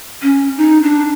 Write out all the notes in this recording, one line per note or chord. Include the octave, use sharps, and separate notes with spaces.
C#4
D#4
D4